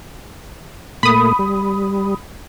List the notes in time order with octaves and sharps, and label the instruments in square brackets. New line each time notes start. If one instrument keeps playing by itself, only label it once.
[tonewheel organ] A#2 A3 A#3 [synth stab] B5 D#6
[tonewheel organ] G3